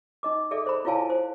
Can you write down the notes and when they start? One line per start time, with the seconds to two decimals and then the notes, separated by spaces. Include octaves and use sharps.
0.23 D#4 D#5 D6
0.51 G#4 A4 D5 E5
0.66 C5 B5
0.85 E4 F4 C#5 F5 G#5 A5
1.10 C5